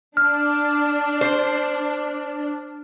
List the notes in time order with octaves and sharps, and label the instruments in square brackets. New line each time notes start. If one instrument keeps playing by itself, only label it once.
[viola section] D4 [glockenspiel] F6
[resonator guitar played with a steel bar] C5